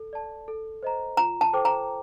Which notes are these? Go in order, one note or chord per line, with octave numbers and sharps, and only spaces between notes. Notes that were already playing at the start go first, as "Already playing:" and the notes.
Already playing: A4
D5 A5
A4
C5 D#5 A#5
F4 A#5
A5
A4 C5 G5 D6
A#5